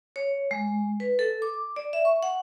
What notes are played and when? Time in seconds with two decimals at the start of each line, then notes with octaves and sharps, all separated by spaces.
0.16 C#5
0.51 G#3
1.00 B4
1.19 A4
1.42 D6
1.76 D5
1.93 E5
2.05 C#6
2.23 F#5